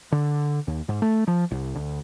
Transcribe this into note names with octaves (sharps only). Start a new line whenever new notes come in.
D3
D#2
G#2
A3
F3
C2
D2